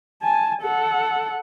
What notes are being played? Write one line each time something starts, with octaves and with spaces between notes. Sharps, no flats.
G#5 A5
A4 F#5